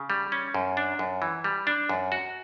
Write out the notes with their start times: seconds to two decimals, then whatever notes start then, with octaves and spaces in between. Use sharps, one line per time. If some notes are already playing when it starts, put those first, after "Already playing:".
Already playing: C#3
0.10 G3
0.32 C#4
0.54 F#2
0.77 D4
0.99 F#2
1.22 E3
1.44 G3
1.67 D4
1.89 F#2
2.12 F#4